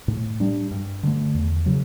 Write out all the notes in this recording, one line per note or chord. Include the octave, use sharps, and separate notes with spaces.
A2
G3 D4
G2
D3 A3
E2
C#3 F#3